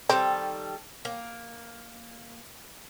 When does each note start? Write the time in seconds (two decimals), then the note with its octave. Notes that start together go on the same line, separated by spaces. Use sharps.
0.09 D#3 G3 C4 A4
1.05 A#3